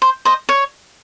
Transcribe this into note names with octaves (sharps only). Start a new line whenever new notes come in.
C5
C5 D#5
C#5